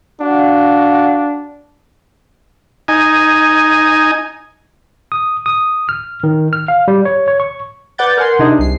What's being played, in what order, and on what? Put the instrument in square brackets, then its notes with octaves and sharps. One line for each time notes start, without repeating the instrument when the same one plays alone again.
[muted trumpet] D4 [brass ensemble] F#4 F5 F#5
[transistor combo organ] D#4 G#5
[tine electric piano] D#6
D#6
F6
D#3
F6
F5
G3
C#5
C#5
C#6
[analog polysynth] B4 D5 F#5 G6 A6
A#4 F#5 G#5 C6
C3 D4 D#4 G#4
C2 C7